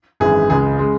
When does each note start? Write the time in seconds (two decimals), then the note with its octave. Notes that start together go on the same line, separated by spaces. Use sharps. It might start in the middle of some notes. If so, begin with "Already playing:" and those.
0.20 G#1 F#2 E3 G#3 G#4
0.50 C#2 C#3 G#3 G#4
0.79 C#3 G#3